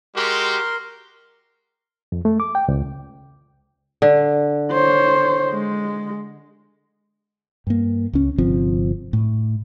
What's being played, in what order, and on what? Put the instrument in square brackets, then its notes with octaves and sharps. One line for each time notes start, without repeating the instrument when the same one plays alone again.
[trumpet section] G#3 F#4 G4 [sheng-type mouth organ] A#4 C6
[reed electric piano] F2
A3
D6
G5
C#2
[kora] D3
[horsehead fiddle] C5 C#5
G#3
[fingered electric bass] G2 A#3
C#2 C#4
G1 C3 F3 C4
A2